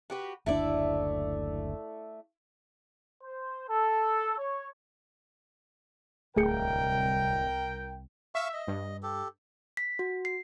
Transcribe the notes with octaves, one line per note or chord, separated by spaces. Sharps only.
F#4 G4 B4
F#1 D2 A3 D4 E4 D5
C5
A4
C#5
D1 C2 A3 G#4 A#4 G5 C#7
E5 F5 C#6
D#5
G2
G4 A4
B6
F#4
C7